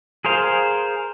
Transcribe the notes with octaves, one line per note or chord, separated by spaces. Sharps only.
G#4 A#4 C5 F5